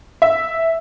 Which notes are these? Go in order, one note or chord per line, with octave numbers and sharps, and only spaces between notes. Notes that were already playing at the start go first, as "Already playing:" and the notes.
E5